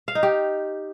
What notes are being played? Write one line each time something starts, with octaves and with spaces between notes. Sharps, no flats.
F5
D#4
G4